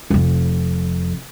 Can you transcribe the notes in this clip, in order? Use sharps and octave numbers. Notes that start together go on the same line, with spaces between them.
F1 F2